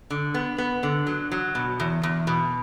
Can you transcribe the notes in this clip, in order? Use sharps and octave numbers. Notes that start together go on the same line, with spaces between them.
D3
B3
B3
D3
F#3
F#3
B2
E2
E2
B2